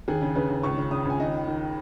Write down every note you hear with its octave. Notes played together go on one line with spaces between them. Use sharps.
D#2 G#4
C#3
C#3 B4
D#2
C#2 C#6
C#3
C#3 D#6
C#2 G#5
D#2 D#5
D#3
D#3